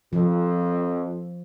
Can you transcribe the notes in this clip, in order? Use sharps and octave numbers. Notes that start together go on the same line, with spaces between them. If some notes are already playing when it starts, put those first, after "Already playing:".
F2 F3